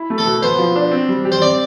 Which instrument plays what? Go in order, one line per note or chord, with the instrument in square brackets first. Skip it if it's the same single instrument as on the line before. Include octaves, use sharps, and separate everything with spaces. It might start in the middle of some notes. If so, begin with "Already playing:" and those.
Already playing: [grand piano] E4
A3
[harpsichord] A4
[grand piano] B2
[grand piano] B3 [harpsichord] C5
[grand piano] F3
D4
C4
G3
G4
[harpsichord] C5
[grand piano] C4 [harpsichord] D5